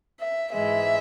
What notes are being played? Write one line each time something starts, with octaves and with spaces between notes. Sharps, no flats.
E5
G#2 E3 G#3 E5